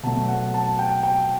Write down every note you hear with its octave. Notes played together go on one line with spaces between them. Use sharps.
B2 F#3 A3 A5
F#5
A5
G5
G5